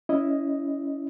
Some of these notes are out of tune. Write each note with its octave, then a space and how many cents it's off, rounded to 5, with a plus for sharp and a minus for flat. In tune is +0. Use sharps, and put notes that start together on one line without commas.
C#4 +20 E4 +0 D#5 +0